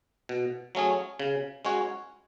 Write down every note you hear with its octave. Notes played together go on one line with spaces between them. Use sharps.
B2
F#3 A3 C#4 G#4
C#3
G#3 C#4 F#4 C#5